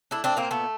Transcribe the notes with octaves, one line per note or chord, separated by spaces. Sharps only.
A3 D4 E4
C4 D4
A#2 A#3 C4
A3 B3